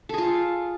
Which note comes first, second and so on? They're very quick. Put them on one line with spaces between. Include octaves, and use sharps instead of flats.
A4 G#4 F4